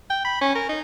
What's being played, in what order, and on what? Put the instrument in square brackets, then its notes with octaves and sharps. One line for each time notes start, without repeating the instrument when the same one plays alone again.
[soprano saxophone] G5
B5
C#4
A#4
D#4